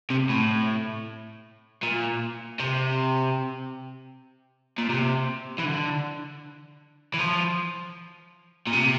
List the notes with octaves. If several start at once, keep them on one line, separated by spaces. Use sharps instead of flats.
C3
A2
A#2
C3
A#2
C3
E3
D3
E3
F3
A#2
C3